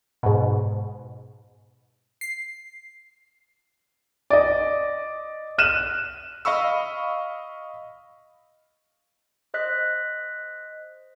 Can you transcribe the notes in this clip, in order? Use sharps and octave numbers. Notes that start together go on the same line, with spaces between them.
G#2 B2
C7
D5 D#5
F6 F#6 D#7 E7
D#5 F5 B5 C#6 E6
C5 D#5 F#6 B6